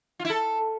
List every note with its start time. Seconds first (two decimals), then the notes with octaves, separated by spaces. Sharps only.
0.20 F4
0.25 E4
0.30 A4